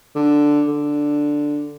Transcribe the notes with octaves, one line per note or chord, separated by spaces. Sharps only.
D3
D3